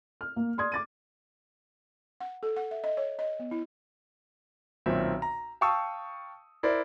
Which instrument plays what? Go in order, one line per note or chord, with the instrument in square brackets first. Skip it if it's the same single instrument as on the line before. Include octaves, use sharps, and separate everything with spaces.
[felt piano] F6
A#3
D5 C6 D#6 G#6
D6 A6 D#7
[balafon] F#5
A4
F#5
E5
D#5
C#5
D#5
B3
E4
[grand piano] B1 A#2 D#3 C4 E5
A#5
F5 G5 A5 C#6 D#6 E6
E4 A#4 C5 D5